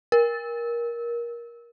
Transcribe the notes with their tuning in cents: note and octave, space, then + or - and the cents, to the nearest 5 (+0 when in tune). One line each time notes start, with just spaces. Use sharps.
A#4 +20